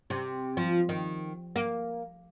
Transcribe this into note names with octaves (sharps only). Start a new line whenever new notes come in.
C3
F3
D#3
A#3